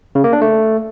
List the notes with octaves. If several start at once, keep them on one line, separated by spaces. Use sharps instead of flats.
C#3
A#3
D4
A3